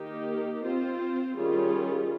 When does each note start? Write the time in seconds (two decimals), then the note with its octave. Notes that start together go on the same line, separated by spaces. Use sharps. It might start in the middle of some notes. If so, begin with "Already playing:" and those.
Already playing: D#3 A#3 D#4 G4 A#4
0.63 C4 F4 C5
1.36 D#3 G3 C#4 F4 G#4